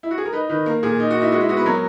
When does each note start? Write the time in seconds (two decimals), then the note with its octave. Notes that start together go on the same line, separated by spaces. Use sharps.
0.03 E4
0.11 F#4
0.18 G#4
0.25 A#4
0.33 D#4 B4
0.49 D#3 B4
0.66 A#3 A#4
0.83 A#2 G#4
1.00 D#4
1.10 F#4
1.16 D#4
1.22 E4
1.32 G#3 F#4
1.41 E4
1.49 B3 F#4
1.57 B4
1.66 F#3 A#4